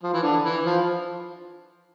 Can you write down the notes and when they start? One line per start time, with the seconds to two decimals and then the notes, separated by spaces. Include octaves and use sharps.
0.03 F3
0.13 E3
0.23 D3
0.44 E3
0.64 F3